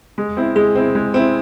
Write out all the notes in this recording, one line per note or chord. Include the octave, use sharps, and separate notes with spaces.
G#3
C4 E4
G#3 G#4
C4 E4
G#3
C4 E4